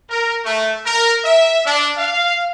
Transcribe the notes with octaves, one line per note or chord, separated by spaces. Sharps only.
A#4
A3
A#4
E5
D4
F5